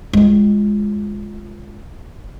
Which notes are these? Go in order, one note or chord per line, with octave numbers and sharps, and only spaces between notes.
G#3 F4